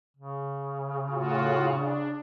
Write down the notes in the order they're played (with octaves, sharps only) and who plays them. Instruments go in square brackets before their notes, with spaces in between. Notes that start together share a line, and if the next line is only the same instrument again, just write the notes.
[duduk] C#3
[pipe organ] A2 F4 F#4
D4